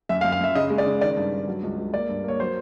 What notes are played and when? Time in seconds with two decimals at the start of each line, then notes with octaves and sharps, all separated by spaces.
0.09 F#2 E5
0.21 F5
0.25 F#2
0.32 F5
0.40 F#2 E5
0.55 C#3 D#5
0.70 G#3
0.78 D5
0.86 C#3
1.01 D#3 D5
1.17 G2
1.32 G2
1.48 F#3
1.63 C#2
1.78 C#2
1.93 A#3 D5
2.09 G2
2.24 A#3 C#5
2.40 F#3 C5